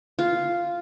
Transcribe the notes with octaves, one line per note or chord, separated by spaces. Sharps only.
F4